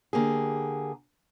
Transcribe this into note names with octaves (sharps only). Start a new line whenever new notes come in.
D3 A#3 G4 G#4